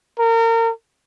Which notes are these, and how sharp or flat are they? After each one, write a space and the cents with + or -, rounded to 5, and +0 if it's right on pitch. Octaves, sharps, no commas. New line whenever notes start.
A#4 -30